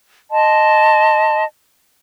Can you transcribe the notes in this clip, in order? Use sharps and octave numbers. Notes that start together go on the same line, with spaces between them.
D#5 A5 C6